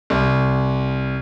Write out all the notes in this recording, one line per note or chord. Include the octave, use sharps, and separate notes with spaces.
C2